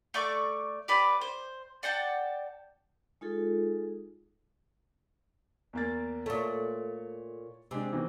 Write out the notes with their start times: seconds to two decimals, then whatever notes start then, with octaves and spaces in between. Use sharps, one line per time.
0.14 A3 D5 C#6 D6
0.88 G4 B4 D5
1.21 C5
1.83 D5 F#5 G5 A5
3.21 G#3 D#4 F4 G#4 A4
5.73 E2 A#3 A6
6.26 A#2 A3 C#5
7.71 C3 G#3 D4
7.93 B2 D#3 E3